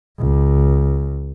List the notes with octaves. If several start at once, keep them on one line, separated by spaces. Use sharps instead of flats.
C#2